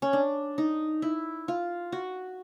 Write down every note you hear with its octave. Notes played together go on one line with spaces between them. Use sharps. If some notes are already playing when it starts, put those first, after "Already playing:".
C#4
D4
D#4
E4
F4
F#4